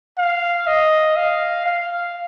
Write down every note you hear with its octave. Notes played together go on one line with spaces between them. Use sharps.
F5
D#5
F5
F5